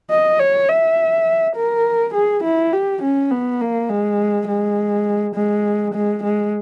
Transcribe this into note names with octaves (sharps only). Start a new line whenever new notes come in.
D#5
C#5
E5
A#4
G#4
E4
G4
C#4
B3
A#3
G#3
G#3
G#3
G#3
G#3